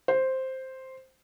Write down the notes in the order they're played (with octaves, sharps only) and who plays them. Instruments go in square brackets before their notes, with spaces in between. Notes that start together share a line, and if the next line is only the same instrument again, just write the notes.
[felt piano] C5